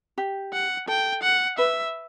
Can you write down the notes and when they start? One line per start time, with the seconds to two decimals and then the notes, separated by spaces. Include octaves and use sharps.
0.18 G4
0.53 F#5
0.88 A4 G5
1.23 F#5
1.58 B4 E5